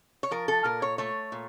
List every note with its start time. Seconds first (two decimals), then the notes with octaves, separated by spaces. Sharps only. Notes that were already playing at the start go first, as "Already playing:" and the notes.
0.23 C#5
0.31 F3 A#4
0.48 A4
0.64 A#2 A#4
0.82 C#5
0.98 A3 C#5
1.32 A#2